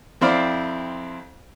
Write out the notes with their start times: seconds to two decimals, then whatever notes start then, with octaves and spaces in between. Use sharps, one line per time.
0.21 F2 C4 E4 C5 D5 F5